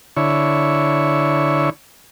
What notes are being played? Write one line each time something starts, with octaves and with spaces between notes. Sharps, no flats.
D3 E4 C#5